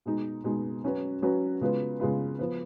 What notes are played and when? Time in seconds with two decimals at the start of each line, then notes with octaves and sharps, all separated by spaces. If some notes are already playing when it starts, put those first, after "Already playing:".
0.06 B2 G#3 D#4
0.44 B2 G#3 D#4
0.84 F#3 C#4 F#4 B4
1.22 F#3 C#4 F#4 B4
1.61 C#3 G#3 B3 F4 B4
2.00 C#3 G#3 B3 F4 B4
2.39 F3 B3